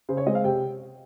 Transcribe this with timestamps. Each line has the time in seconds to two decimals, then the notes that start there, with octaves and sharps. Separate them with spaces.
0.09 C#3 C5
0.17 C#5
0.27 G#3 C4 D#5
0.35 F5
0.44 C3 G5